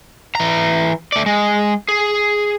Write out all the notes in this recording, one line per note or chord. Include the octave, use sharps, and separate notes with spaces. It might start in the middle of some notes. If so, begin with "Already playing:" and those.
E3 A#5
A3 D5
G#3
G#4